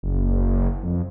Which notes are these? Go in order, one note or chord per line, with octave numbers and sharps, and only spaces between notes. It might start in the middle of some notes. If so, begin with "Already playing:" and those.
F#1
F2